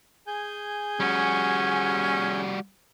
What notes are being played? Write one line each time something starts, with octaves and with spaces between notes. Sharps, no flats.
G#4 G#5 G6
G3 C#4 F#4